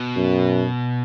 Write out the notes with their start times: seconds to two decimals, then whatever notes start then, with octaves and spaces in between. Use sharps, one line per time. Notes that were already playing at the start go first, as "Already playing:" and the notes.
Already playing: B2
0.16 F#2